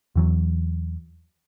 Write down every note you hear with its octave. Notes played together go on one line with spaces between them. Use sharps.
E2 E3 F#3